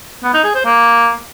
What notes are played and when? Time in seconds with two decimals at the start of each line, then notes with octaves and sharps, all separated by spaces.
0.23 B3
0.34 D#4
0.44 G#4
0.55 C5
0.65 A#3